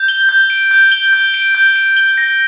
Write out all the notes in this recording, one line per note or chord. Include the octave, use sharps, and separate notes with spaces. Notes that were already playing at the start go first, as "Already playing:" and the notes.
Already playing: G6
G7
G6
D7
G6
G7
G6
D7
G6
D7
G7
A#6